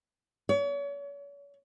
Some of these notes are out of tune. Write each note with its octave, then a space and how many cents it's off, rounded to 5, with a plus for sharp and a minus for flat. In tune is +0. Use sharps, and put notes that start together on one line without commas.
C#5 +40